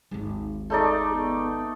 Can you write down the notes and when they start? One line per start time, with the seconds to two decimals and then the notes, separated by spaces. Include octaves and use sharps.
0.11 G#1 D#2
0.70 A3 D#4 G#4 D5
1.13 B3